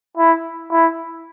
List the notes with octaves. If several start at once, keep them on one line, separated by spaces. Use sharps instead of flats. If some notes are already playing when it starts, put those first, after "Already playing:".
E4
E4